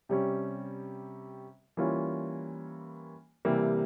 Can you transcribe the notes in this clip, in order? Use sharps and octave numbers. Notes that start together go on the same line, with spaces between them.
C3 G3 C#4
E3 G3 A#3 C#4 F4
C3 E3 G3 A#3